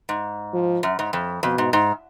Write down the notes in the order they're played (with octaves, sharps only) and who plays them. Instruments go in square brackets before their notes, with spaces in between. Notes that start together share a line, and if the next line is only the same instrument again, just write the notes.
[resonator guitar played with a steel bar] G#2
[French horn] F3
[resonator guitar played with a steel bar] F#2
G#2
F2
[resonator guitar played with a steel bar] F2 [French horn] B2
[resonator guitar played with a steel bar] G#2
G#2